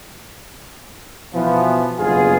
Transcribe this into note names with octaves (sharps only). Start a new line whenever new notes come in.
B2 E3 F3 B3
F#1 G2 B2 B3 F4 G#4